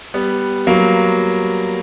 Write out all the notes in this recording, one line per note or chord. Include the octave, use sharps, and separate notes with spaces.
G3 B3
F#3 A#3